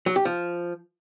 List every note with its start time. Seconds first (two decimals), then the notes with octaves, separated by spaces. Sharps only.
0.06 F#3
0.16 G4
0.25 F3